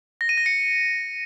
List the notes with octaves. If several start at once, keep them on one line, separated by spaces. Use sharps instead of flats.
A#6
D#7
A#6
C#7